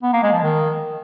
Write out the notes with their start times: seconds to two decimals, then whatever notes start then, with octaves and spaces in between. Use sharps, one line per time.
0.03 B3
0.13 A#3
0.23 G#3
0.33 F3
0.43 D#3